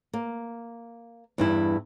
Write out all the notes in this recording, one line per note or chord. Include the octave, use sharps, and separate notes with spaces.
A#3
E2 G2 E4